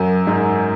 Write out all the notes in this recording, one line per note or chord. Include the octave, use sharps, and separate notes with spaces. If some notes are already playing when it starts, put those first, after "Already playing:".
Already playing: F#2
G#2